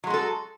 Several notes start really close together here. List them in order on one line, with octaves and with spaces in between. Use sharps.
F#3 G#3 F#4 A4